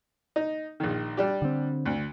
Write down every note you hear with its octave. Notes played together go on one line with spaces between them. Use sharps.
D#4
A#1 D#3
G3 D4 G4
D3 C4
D2